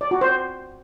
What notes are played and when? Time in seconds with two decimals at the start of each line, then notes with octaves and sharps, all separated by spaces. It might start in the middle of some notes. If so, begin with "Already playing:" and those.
0.01 D5
0.11 F#4
0.21 C5